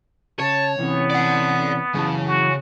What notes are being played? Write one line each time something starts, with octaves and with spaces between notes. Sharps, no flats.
C#3 C#5 A5
C3 E3 B3 C#4
D5 F#5
F#2 C#3 E3 A5
F#4